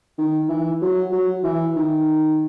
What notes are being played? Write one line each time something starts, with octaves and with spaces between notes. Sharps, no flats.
D#3
E3
F#3
F#3
E3
D#3